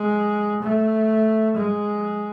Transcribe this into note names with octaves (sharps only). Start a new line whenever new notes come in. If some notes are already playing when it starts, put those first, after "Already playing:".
Already playing: G#3
A3
G#3